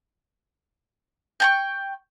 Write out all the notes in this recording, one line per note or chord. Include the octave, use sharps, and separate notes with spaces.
G5 A5 C#6